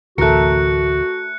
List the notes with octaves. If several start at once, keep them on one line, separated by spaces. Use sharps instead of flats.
D1 A1 D2 A3 F#4 A#4 F#6 C#7